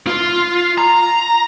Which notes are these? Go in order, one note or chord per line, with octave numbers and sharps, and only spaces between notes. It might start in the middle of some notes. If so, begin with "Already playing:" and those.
F4
A#5